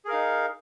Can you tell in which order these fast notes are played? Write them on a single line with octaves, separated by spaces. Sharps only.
G#4 A#4 F5 D#4